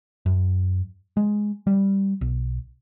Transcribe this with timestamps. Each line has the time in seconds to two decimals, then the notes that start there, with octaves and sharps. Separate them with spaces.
0.26 F#2
1.17 G#3
1.67 G3
2.21 B1